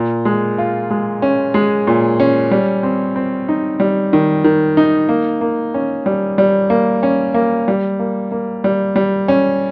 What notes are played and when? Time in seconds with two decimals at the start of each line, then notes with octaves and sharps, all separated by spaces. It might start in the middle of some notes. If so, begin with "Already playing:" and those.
Already playing: A#2
0.25 G#3
0.58 F4
0.90 G#3
1.22 C#4
1.54 G#3
1.87 A#2
2.20 C#4
2.51 G3
2.83 C4
3.16 C4
3.49 D#4
3.80 G3
4.13 D#3
4.44 D#3
4.77 D#4
5.09 A#3
5.41 A#3
5.74 C#4
6.06 G3
6.38 G3
6.70 A#3
7.03 C#4
7.34 A#3
7.68 G3
7.99 A#3
8.32 A#3
8.64 G3
8.96 G3
9.28 C#4